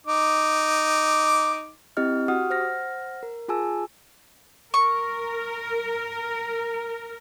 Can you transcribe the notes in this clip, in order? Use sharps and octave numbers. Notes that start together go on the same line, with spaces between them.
D#4 D6
C4 E4 G4 D#5 F6
F#4 G4 F#5 D#6 F6
C5 F#5 F6 A#6
A#4
F4 G#4 G#5 A5 E6
A#4 C#6